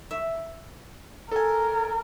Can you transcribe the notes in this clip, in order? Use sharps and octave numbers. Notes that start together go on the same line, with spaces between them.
E5
A4 A#4 G#5